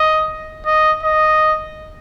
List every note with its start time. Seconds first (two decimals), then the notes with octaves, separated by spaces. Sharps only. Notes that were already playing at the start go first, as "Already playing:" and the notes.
Already playing: D#5
0.66 D#5
1.03 D#5